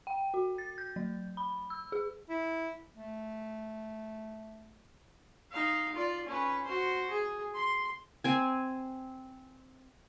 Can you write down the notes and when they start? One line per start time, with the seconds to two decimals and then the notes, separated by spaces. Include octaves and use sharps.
0.07 G5
0.34 F#4
0.58 A6
0.78 G6
0.96 F#3
1.37 B5
1.70 E6
1.92 G#4
2.29 E4
2.96 A3
5.51 D#4 F5
5.95 F4 D5
6.27 C#4 B4
6.64 F#4 C5
7.10 G#4
7.54 C6
8.24 C4 G#5